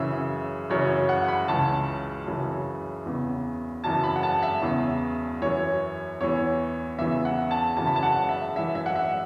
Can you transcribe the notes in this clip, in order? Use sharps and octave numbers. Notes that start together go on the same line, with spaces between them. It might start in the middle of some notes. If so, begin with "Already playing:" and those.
Already playing: F#2 C#3 E3 E5
F#2 C#3 E3 C#5
F#5
B5
C#2 C#3 E3 A5
F#2 C#3 E3
E2 C#3 E3
F#2 C#3 E3 A5
B5
F#5
A5
E5
E2 C#3 E3
F#2 E3 C#5
E2 E3 C#5
E2 C#3 E3 E5
F#5
A5
F#2 C#3 E3 A5
B5
A5
F#5
E5
F#2 E3 E5
E5
F#5
E5